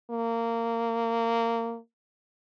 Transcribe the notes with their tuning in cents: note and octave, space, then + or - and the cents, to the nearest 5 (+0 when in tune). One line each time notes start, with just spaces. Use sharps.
A#3 -20